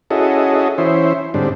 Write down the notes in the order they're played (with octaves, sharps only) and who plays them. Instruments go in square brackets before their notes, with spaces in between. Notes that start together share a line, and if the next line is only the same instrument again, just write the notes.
[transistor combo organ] C#4 E4 F#4 G#4 A4 D#5
E3 C#4 E4 C5
G#2 D3 G3 C4 D4